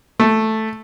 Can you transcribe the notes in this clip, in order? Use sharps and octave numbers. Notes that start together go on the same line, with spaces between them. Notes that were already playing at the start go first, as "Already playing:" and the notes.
A3